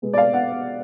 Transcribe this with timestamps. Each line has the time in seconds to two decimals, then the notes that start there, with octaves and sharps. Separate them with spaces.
0.02 B2 G#3 B3
0.13 D5
0.18 F5
0.33 F#5